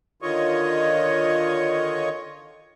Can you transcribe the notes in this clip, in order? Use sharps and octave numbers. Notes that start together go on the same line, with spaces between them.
D3 D#3 F4 C#5 D#5 C#6